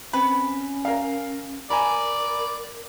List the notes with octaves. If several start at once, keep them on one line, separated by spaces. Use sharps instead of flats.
C4 C#4 B4
A#4 F5
A#4 D5 G#5 A#5 B5